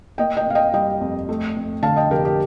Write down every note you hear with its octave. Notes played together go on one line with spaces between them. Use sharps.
A#3 D#5 G5
D#5 G5
C3 F5
D#5 G5
G3 D#5 G5
F2
A3
F2
D3 F5 A5
D#5 G5
F1 G4 A#4
G4